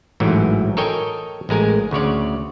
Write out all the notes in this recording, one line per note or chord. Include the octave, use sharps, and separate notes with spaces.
A1 G#2 E3 F#3
A4 A#4 C#5 D#5 G5 G#5
A1 G#3 A#4 G#5
D2 C#3 C#5 D5